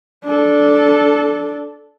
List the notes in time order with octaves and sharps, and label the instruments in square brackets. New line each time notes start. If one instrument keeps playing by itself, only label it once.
[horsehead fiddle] D4 A4